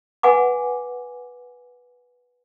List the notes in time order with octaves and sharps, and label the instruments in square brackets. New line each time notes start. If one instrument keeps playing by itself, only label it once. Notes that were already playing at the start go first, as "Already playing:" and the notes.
[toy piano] B4 F#5 G#5 D6